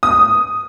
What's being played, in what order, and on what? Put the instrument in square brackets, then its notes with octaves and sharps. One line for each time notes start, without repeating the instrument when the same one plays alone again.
[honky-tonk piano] D#6